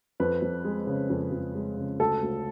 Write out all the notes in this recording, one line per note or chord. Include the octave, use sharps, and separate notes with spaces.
F2 B4
F2
G#3
C#3
F2
F2
G#3
C#3
D2 A4
D2